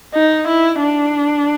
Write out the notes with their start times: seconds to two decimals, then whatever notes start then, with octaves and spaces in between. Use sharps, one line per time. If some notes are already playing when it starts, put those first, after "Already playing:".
0.14 D#4
0.48 E4
0.81 D4